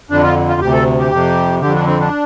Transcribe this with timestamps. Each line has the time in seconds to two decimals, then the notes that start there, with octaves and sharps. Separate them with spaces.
0.10 F2 D3 D4
0.23 F4
0.49 F4
0.61 D2 C3 G4
0.73 A4
0.99 G4
1.12 F2 C3
1.61 F2 D3 G4
1.74 D4
1.87 C4
2.00 D4